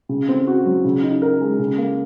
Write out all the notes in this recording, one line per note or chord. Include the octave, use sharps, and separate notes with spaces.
C#3
C4
F#4
F#3
C#3
D#4
A#4
G#3
C#3
A#3